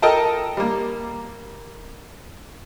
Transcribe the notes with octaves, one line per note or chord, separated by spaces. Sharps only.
A4 A#4 D#5 G5 A5
G3 A#3